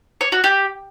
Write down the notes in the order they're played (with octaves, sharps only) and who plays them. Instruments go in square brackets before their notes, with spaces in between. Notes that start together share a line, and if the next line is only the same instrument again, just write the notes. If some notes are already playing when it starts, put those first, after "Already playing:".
[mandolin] C#5
F#4
G4